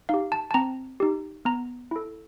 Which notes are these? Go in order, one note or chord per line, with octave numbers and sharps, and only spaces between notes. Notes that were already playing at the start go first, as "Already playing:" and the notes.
D#4 G4 F5
A5
A5
C4 A#5
D#4 G4
B3 A#5
E4 A4